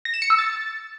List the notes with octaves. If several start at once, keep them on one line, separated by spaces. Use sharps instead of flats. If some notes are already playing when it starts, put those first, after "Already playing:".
A#6
E7
C#7
E6
A6